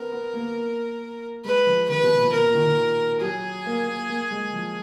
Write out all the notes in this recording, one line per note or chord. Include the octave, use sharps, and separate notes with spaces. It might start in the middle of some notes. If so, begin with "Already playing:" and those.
Already playing: B3 A#4
B3
A#3
G#3 B4
F3
D#3 B4
B2
A#2
A#2 A#4
A#2
D#3
D#3
F#3 G#4
A#3
A#3
A#3
G#3
F3